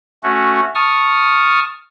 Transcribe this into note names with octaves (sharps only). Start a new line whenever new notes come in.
A3 C#4 F#4
A5 C#6 D#6 F6